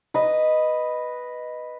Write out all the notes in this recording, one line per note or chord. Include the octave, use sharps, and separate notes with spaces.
B4 D#5